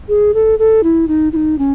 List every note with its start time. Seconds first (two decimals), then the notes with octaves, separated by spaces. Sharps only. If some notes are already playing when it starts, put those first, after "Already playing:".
0.09 G#4
0.34 A4
0.59 A4
0.83 E4
1.08 D#4
1.33 E4
1.36 D#4
1.58 C#4